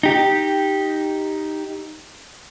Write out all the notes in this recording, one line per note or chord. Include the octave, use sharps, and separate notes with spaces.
D#4 G4